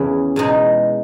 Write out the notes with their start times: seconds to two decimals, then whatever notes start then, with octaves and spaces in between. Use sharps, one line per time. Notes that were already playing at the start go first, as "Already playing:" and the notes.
Already playing: E2 C#3 E3
0.36 E2 B2 G#3 D#4